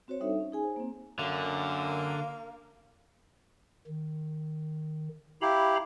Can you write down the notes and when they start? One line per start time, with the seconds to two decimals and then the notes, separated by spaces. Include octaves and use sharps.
0.08 C4 F#4 C5 C#5
0.20 G3 D4 D#4 A4 E5
0.40 C#4
0.52 D#4 G#4 G#5
0.64 C5
0.76 A#3 C4
1.19 F#2 D3 A#3
3.87 D#3
5.42 E4 G4 F5 A#5 B5